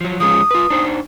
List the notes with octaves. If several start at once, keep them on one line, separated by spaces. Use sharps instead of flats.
F3 F#3
F3 G#3 C#4 D#6
F4 B4
D4 D#4 C5